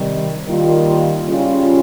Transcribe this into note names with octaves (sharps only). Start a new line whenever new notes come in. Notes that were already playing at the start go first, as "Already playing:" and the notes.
Already playing: C3 D#3 G3
D#3 G3 A#3 F4
C#3 G3 C#4 F4